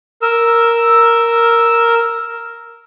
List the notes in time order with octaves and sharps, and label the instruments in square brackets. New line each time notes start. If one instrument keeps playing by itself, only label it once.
[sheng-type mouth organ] A#4 E6